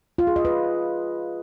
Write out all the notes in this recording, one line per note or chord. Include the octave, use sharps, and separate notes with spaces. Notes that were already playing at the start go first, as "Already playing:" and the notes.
F4
G#4
D#5
B4